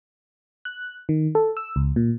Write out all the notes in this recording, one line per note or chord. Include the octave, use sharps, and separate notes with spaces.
F#6
D#3
A4
E6
C#2
A#2